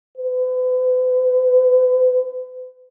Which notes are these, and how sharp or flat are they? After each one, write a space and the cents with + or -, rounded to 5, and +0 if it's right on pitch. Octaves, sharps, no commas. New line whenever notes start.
B4 +45